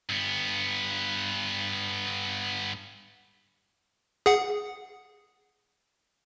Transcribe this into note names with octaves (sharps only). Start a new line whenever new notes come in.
G2 B3
G#4 F#5